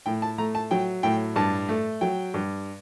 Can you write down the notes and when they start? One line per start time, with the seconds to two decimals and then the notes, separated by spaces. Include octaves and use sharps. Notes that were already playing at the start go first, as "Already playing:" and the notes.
0.06 A2 G5
0.22 A5
0.38 A3 A#5
0.55 A5
0.71 F#3 G5
1.03 A2 G5
1.36 G2 A5
1.69 A3
2.01 F#3 G5
2.34 G2